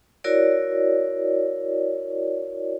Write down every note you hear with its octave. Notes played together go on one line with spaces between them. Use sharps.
E4 F#4 A#4 C#5 D5